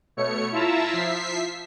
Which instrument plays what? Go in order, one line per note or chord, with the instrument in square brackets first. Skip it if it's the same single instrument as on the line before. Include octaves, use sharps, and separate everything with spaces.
[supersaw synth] B2 A3 C#5 C#7
E4 F4 E5 A5 A#5 E6
F3 E5 B6 C7